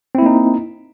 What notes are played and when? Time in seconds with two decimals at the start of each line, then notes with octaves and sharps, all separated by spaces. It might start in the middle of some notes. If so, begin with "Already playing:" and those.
0.15 C4
0.18 E4
0.22 A#3
0.26 D#4